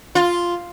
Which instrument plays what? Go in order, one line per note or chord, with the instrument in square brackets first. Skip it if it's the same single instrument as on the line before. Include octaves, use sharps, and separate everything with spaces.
[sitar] F4